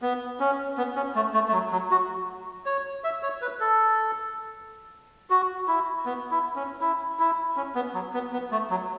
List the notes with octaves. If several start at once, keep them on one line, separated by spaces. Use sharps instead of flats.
B3
C#4
B3
C#4
A3
A3
A3
F#3
F#3
F#4
C#5
E5
C#5
B4
A4
F#4
E4
B3
E4
C#4
E4
E4
C#4
B3
F#3
B3
B3
A3
F#3